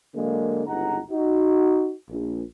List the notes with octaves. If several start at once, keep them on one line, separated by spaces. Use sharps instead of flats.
D3 F#3 G#3 A#3
G1 C#2 D#4 F#5 A#5
D#4 F#4
A#1